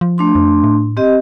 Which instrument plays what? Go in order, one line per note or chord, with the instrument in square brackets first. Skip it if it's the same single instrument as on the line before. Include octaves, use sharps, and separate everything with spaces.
[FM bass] F3
[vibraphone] A3 D4 C6
[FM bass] F2
A2
[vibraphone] C4 G4 D#5